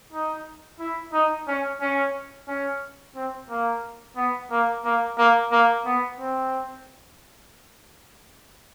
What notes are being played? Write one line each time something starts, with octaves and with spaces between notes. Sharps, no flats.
D#4
E4
D#4
C#4
C#4
C#4
C4
A#3
B3
A#3
A#3
A#3
A#3
B3
C4